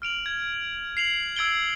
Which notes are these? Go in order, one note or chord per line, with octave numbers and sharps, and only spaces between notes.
F6 D7 F7 F#7
G#6
C7 F7 F#7
E6 G#6 D7 G7